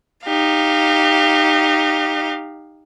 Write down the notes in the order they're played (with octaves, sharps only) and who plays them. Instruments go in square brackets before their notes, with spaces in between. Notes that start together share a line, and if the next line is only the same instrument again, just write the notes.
[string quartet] D#4 G4 F5